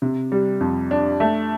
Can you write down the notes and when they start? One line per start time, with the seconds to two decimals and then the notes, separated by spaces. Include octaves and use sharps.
0.02 C3
0.32 G3
0.61 F2
0.91 D4
1.20 A3